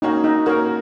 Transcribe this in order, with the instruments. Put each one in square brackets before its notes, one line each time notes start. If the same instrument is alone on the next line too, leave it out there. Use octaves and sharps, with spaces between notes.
[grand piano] A#3 C#4 F#4 [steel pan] D#4
[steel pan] D#4
[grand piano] A#3 C#4 F#4 [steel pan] A#4